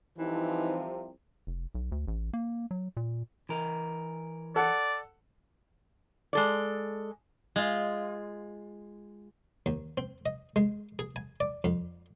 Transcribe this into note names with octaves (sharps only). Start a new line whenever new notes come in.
C2 C3 E3 F3 D#4
F1
B1
D2
A1
A#3
F#3
A#2
E3 A#4
A4 D5 F#5
G#3 A4 D5
G#3 F4
D#2
C4
D#5
G#3
G#4
G#5
D5
F2